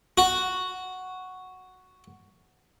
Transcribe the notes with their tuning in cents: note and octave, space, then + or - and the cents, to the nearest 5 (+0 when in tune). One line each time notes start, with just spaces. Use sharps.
F#4 +0